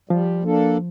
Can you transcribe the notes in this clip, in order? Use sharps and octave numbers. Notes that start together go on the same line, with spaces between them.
F3 G3
A#3 D4 A4